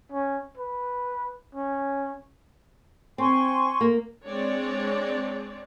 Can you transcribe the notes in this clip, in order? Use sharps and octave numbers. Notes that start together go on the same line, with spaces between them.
C#4
B4
C#4
C4 G#5 C6 C#6
A#3
G#3 C4 D4 C#5 D5